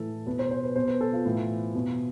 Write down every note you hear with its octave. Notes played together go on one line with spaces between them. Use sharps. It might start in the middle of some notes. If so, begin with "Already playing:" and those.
Already playing: A2 E3 A4
B2 B4
C5
C5
B4
B2 C5
B4
A4
F4
A2 E3
B2